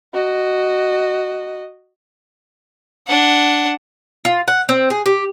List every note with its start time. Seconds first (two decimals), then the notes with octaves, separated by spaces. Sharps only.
0.13 F#4 D#5
3.07 D4 F#5
4.25 F4
4.48 F#5
4.69 C4
4.90 G#4
5.06 G4